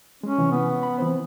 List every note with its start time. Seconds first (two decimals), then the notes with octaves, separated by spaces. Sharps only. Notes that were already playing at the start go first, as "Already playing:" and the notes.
0.23 G#3 C#4
0.38 C3 E3
0.51 B3
0.83 B5
0.98 E3 C4 C5